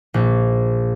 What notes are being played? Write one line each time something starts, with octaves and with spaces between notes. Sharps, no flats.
A#1